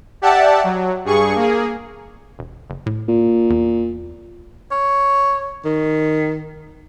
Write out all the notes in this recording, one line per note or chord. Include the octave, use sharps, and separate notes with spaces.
G4 D5 E5 F#5 A5
F#3
G2 G#4 C#6
A#3 G#4
E1
F#1
A2
A#2
E2
C#5
D#3